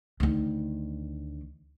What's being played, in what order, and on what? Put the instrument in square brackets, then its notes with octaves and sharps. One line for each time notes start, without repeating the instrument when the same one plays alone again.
[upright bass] D2 D#3